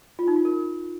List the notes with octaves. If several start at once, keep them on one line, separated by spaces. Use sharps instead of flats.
F4
D#4
F4
A#4